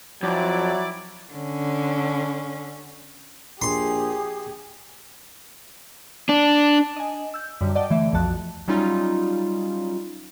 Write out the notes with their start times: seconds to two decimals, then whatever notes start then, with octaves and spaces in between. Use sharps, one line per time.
0.23 F2 F#3 E4 D5 D6
1.33 D3 C#4
3.62 A#1 G4 G#4 C6
6.29 D4
6.96 D#5 G#5
7.34 E6 G6
7.61 F#2 D3 G3
7.75 D5 D#5 F#5 G5 A5 D6
7.90 D3 E3 A3 D5 E5
8.13 B1 F2 F3 F#4 A5 F#6
8.68 F#3 G3 C#4 D#4 F4